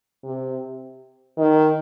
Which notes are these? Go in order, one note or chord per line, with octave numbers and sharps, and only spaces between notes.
C3
D#3